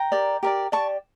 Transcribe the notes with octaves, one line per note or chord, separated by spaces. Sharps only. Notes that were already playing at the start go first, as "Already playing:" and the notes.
Already playing: G5 A#5
G4 A#4 D5
G4 A#4 D5
G4 D5 A5 C#6